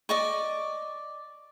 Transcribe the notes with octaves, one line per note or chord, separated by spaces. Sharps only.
D5 D#5 C#6